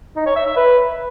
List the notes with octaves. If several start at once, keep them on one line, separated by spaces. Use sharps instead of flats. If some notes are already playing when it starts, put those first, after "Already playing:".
D#4
C#5
E5
E5
B4